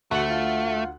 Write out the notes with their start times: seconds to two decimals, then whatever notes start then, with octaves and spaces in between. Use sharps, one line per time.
0.11 D2 A3 F#4 F#5 F#7
0.31 F4